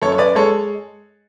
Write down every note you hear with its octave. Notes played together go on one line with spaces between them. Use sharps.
F#2 A4 C#5
C#5
B4 D5
G#3 A4 C#5